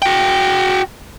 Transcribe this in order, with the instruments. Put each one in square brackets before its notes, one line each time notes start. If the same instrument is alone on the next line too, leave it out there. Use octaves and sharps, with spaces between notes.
[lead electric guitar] F#4 G5